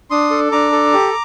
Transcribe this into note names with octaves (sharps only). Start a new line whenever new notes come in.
D4 C6 D#6
A4
D4 A#5 D6
A4
G4